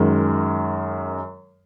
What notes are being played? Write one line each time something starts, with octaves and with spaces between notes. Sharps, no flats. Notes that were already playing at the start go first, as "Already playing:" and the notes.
Already playing: F#2 D#3 G#3